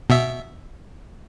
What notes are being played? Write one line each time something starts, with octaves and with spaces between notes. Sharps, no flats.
B2 E5